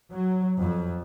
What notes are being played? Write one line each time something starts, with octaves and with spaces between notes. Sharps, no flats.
F#3
F2